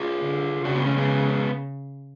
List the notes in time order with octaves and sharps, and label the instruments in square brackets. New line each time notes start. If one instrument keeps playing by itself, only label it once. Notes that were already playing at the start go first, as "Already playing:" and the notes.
Already playing: [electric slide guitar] F4 G#4
[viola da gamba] D3
[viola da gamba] C#3 [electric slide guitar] D4 F#4
[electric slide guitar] B3 D4
A3 C#4
G#3 B3